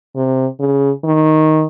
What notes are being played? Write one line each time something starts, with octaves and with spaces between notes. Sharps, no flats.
C3
C#3
D#3